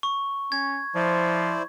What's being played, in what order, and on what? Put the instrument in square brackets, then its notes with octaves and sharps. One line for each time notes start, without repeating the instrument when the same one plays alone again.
[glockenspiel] C#6
[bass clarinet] C#4 [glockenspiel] G#6
[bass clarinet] F3 [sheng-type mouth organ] E4 C5 D5